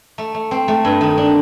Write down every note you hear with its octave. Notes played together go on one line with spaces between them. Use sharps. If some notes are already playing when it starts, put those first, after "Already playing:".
A3
A3
C4
A3
G2
D#3
D4